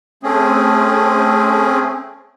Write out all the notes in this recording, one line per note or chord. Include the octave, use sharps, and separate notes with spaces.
A3 C4 C#4 G#4